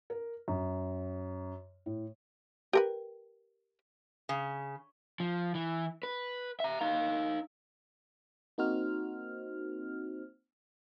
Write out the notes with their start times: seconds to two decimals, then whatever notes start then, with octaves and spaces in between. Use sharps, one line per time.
0.10 A#4
0.48 F#2
1.86 A2
2.73 G4 A#4 B4
4.29 C#3
5.20 F3
5.55 E3
6.03 B4
6.60 E5 A#5
6.81 D#4 F5
8.58 A#3 C4 D#4 F#4 C5 F6